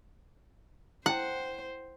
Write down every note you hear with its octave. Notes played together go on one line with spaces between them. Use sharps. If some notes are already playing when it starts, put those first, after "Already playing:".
E4 C5 F#5 G5